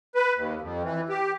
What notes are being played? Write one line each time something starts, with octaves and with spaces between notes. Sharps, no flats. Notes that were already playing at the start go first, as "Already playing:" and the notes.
B4
D#2
F2
E3
G4